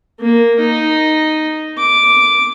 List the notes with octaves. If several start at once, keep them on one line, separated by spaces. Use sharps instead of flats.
A#3
D#4
D6